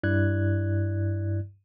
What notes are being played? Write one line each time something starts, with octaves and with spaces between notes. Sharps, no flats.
G2 E4 D5 F#6 G#6